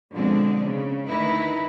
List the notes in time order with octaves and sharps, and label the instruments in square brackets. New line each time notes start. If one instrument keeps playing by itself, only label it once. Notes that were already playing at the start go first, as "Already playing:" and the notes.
[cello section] B2 D3 F3 G#3 C4 D4
C#3
D2 D#3 A3 D#4 E4 B4